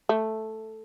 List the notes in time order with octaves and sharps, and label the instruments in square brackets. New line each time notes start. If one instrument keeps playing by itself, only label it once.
[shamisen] A3